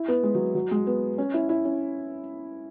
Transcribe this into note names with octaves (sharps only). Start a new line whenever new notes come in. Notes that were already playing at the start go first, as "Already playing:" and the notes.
Already playing: E4
B3
G#3
F#3
F#3
G#3
B3
C#4
E4
E4
C#4